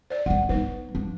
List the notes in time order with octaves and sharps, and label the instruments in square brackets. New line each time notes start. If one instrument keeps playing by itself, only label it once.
[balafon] C5 D5
[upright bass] G#1 D#3 [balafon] F#5
[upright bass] F#3 B3 [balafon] D#4 B4 C5
[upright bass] F3 D4